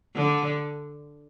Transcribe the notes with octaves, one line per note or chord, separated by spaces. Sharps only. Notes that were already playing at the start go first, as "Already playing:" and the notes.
D3